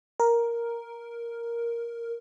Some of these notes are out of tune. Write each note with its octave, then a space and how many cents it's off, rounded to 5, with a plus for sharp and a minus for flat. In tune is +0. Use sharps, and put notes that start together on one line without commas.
A#4 +5